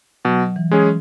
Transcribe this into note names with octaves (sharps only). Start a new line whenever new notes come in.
B2 F#3
E3
G#3 C#4 G#4